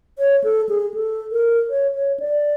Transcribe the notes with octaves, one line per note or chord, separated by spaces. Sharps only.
C#5
A4
G#4
A4
A#4
C#5
C#5
D5